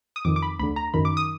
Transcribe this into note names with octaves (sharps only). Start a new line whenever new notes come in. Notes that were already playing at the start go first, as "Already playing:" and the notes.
D#6
F2 D#3 D6
D6
B5
D2 D3 B5
A#5
F#2 D#3 B5
D6
D#6